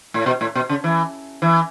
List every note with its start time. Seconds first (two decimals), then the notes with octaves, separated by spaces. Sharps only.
0.14 A2
0.26 B2
0.41 A2
0.55 B2
0.69 C#3
0.84 E3
1.42 E3